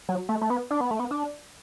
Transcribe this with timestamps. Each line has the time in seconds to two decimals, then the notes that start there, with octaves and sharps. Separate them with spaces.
0.09 F#3
0.29 A3
0.41 A3
0.50 B3
0.71 D4
0.80 B3
0.91 A3
0.99 B3
1.11 D4